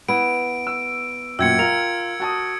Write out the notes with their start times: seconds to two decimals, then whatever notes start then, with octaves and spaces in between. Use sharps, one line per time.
0.08 B3 E4 D7
0.67 E6
1.39 F#2 A#2 G5 E6 G#6 C#7
1.59 F4 A#4 F7
2.20 F#4 A5 D#6